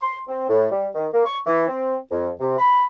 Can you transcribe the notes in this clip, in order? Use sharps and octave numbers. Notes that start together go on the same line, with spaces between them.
C6
C4
A2
G3
D#3
A#3
C#6
E3
C4
F2
C3
B5